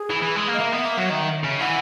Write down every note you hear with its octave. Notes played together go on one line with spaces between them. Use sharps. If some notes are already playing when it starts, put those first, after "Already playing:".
Already playing: G#4
E3
E3
G#3
A#3
D#5
A#3 E5
B3
A#3
F#3
D#3
C#3
E3 F#5